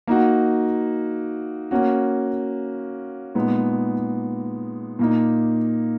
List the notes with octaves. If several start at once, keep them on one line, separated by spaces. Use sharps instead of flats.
A#3 D#4 F#4
A#3 C#4 F#4
A#2 G#3 B3 D#4
A#2 A#3 D#4